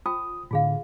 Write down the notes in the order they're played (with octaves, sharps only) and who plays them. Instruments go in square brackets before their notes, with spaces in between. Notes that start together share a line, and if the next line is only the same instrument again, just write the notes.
[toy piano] F4 C5 G5 [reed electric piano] D#6
[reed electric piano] A2 D3 [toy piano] F4 G#4 F5